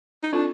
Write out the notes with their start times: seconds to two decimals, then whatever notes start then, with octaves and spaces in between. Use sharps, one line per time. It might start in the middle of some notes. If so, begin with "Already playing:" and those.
0.23 D#4
0.33 C4 D4 F4 A4